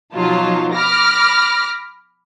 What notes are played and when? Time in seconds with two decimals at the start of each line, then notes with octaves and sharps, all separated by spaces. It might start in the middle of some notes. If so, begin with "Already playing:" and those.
0.12 B2 F3 F#3 D#4 F4 A5
0.75 B5 D6 F6 A#6